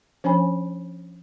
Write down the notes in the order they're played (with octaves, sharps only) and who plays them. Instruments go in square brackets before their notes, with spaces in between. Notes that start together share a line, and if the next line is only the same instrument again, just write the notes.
[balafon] F3 C#4 D4 C#5 G#5 B5